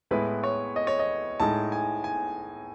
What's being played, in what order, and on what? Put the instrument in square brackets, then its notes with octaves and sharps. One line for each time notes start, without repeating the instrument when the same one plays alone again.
[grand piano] A2 G#3 B3 E4 B4
C#5
D#5
C#5
D#5
A2 G#3 D#4 A5
G#5
G#5